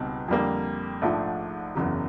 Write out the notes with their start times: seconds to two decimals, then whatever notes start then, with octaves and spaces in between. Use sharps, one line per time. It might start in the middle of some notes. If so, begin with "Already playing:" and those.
Already playing: C#2 B2 G3 C4 D#4
0.28 F2 D3 G3 A#3
1.02 A#1 G#2 F3 A3 D4
1.75 F#1 E2 C#3 F#3